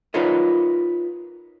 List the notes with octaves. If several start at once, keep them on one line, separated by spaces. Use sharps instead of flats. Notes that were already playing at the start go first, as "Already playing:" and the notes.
D#4 F4 A#4 B4 C#5 D#5